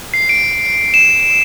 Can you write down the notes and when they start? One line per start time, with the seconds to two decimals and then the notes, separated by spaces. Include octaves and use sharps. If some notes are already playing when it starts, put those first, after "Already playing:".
0.14 C7
0.29 D7
0.94 E7